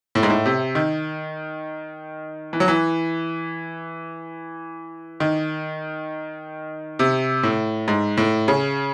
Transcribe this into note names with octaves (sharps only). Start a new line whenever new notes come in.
A2
G#2
A2
C3
D#3
E3
F#3
E3
D#3
C3
A2
G#2
A2
C#3